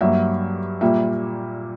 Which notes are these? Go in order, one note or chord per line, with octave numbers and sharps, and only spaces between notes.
G2 F#3 A#3 E5
A#2 G3 A#3 E5